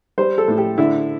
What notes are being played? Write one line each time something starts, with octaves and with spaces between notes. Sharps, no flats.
G3 C5
A4
A2
G4
D3 E4